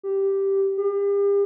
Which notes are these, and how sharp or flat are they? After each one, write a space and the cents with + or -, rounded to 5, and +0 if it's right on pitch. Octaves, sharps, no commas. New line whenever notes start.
G4 -5
G4 +40